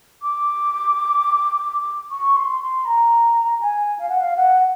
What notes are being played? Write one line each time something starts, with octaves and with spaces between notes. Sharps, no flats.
D6
C#6
C6
C6
A#5
G#5
F5
F#5
F5
F#5